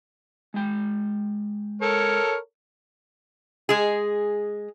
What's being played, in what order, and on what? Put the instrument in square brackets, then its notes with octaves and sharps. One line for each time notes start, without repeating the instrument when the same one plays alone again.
[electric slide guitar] G#3 G5
[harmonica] A4 A#4 C#5
[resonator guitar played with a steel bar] G#3 G#4